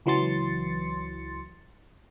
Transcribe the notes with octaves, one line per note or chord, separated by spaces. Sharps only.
C#2 E3 F#3 C6 A6 C#7